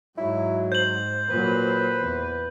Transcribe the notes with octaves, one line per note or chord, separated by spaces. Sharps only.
G#2 F#3 E4
C5 G6 F#7
A#2 F#3 B4
E2